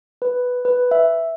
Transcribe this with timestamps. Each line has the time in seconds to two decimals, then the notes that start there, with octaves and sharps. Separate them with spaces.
0.22 B4
0.65 B4
0.91 E5